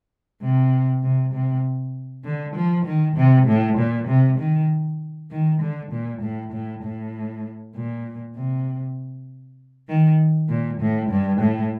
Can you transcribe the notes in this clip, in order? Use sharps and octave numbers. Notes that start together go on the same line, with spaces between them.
C3
C3
C3
D3
F3
D#3
C3
A2
A#2
C3
D#3
D#3
D3
A#2
A2
A2
A2
A#2
C3
D#3
A#2
A2
G2
A2